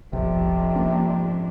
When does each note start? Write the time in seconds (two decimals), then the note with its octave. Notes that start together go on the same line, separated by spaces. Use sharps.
0.13 F1 B1 F2 G#2 C3 D4
0.76 A#3 C#4